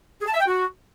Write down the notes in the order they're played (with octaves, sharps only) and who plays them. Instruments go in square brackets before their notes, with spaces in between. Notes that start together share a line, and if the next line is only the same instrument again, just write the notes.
[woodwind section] G#4
A5
E5
G5
F#4